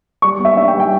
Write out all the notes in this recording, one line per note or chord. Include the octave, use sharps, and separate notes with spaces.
G3 C#6
B3
E5
D4 E5
G5
G3
G5